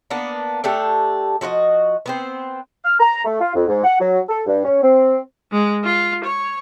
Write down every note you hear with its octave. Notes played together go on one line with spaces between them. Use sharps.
A#3 B3 D4
A3 D4 G4 A4
F3 F#4 B4 D#5
B3 C4 C5
F6
A#5
A3
F4
F2
G#2
F#5
F#3
A4
G2
C#4
C4
G#3
F4
C#5